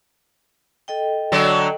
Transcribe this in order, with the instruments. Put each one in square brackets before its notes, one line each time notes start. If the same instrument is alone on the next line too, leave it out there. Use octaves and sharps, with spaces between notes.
[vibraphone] A4 D#5 G5
[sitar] D3 F#3 D4